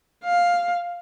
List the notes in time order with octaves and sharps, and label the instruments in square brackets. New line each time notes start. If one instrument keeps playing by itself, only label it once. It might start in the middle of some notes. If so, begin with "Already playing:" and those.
[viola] F5